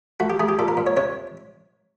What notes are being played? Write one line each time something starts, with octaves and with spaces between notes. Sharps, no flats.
A3 F#4
G4
A3 G#4
G4
A#2 A4
A#4
A#2
C#5
C3 C#5